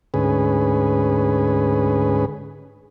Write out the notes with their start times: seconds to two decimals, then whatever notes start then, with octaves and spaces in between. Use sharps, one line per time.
0.14 D2 G#2 C#4 G#4 B4